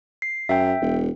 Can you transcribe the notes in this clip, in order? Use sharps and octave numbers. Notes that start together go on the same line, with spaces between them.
C7
F#2 E5 G5
E1